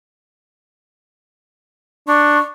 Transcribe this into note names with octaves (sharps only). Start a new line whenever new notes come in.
D4 C#6